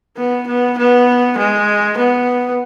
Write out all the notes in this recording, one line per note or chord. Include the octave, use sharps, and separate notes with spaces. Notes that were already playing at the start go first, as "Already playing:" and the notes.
B3
B3
B3
G#3
B3